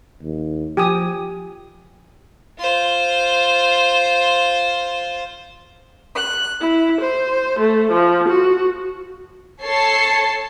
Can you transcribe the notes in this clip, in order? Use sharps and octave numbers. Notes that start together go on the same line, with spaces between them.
D#2
F3 G4 G#5 D#6
F4 C5
F#6
E4
C5
A3
F3
F#4
A4 C#5 A5 C7